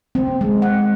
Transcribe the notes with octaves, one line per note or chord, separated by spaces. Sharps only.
C4
G#3
F#5